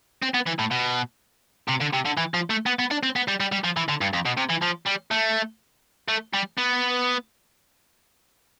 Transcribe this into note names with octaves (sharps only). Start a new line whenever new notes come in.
C4
B3
E3
A2
B2
C3
D3
C3
D3
E3
F3
A3
B3
B3
D4
C4
B3
G3
G3
G3
F3
E3
D3
G2
F2
B2
C3
E3
F3
G3
A3
A3
G3
B3